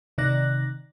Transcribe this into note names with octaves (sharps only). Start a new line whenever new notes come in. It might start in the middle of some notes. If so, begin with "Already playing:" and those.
C3 D#3 D#4 D5 F#6 A#6